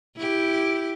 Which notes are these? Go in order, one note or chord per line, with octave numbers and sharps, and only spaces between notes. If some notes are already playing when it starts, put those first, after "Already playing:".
E4 G4